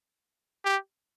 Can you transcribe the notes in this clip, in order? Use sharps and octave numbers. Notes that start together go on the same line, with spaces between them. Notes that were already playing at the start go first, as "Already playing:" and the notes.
G4